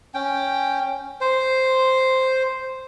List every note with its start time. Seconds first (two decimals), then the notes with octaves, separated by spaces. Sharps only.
0.14 C#4 G5
1.21 C5